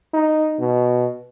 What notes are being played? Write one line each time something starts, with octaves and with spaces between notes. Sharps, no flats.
D#4
B2